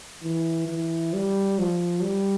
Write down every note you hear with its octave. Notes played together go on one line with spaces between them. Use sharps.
E3
E3
G3
F3
G3